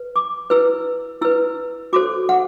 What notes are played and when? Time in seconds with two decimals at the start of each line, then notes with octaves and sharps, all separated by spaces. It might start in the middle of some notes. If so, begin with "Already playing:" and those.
Already playing: B4
0.16 D6
0.50 E4 B4 E6
1.21 E4 B4 E6
1.93 F#4 A4 C5 D6
2.29 F#5